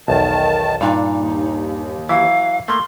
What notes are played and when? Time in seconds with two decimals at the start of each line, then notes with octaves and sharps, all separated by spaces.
0.08 B1 E2 D#3 A5
0.81 G2 A#2 D4 D#4
1.17 D#2
2.09 E3 F#3 E4 F5
2.68 A3 A#3 C6